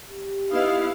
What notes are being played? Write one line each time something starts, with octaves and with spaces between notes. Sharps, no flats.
G4
B3 D#4 E4 B4 D#5 F5